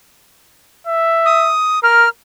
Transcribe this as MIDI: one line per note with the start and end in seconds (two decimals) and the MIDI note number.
0.87 1.53 76
1.26 1.80 87
1.83 2.07 70
1.83 2.09 89